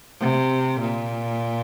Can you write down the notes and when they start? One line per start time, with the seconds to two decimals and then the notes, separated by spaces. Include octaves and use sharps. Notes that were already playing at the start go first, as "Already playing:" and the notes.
0.21 C3
0.80 A#2